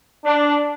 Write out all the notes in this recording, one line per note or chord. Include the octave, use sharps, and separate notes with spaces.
D4